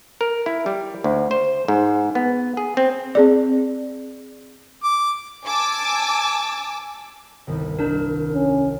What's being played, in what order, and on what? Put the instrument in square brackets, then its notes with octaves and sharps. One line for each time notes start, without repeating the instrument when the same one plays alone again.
[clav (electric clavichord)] A#4
E4
G3
D2
C5
G#2
B3
G#4
C4
[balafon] C4 G#4 D5
[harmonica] D6
[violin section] G#5 A5 D6 E6
[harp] G1 C2 D#3
[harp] D#1 F#6 G#6 [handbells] D4 A#4
[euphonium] C#4